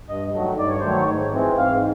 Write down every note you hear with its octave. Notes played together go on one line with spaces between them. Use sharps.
G2 D#5
D#3 F#3 A3
G2 D5
C#5
D#3 F#3 A3 C5
C#5
G#2
E3 G#3 C4
G#2 F5